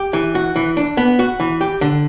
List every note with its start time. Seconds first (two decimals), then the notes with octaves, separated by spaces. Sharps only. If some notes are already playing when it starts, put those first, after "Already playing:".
Already playing: G4
0.13 E3
0.35 F#4
0.56 E3
0.77 D4
0.97 B3
1.19 F#4
1.40 E3
1.61 G4
1.81 D3